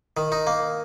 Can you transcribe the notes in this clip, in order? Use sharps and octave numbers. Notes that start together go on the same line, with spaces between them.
D#3
D#4
A#3